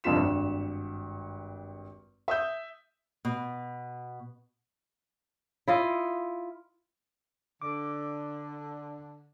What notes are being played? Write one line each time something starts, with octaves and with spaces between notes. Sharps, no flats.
C2 F2 D3 F4 B6 E7
G#1 G2
E5 D#6 G6
B2
E4 F4 D#5
D3 D6